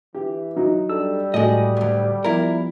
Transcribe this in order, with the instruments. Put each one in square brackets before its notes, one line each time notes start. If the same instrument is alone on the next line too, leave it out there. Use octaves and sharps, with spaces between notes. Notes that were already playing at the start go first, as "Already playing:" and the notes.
[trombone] E3 [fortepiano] G4
[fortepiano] F#3 D#4
[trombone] G3 [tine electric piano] D4 A4 E6
[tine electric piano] A2 [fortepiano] F#3 A3 [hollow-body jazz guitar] G#3 D#5
[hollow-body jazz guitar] D2 G#2
[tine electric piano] F3 B3 F4 [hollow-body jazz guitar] E4 A#4